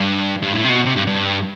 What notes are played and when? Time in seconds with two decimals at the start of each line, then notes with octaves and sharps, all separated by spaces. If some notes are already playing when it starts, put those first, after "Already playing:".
Already playing: G2
0.42 G2
0.53 A2
0.65 C3
0.70 B2
0.86 C3
0.96 G2
1.07 G2